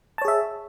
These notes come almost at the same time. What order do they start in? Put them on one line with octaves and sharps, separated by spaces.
A5 C#5 G#4 E5